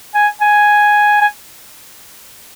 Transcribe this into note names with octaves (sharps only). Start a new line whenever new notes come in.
G#5
G#5
G#5